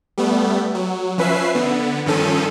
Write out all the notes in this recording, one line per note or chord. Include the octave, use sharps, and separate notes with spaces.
G3 A3 B3
F#3
F3 C#4 B4 E5 C7
D3 B3
G2 D#3 F3 C#4 A4 D#7